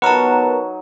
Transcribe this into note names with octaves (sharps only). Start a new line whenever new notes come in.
F#3 B3 D#4 A#4 B4 A5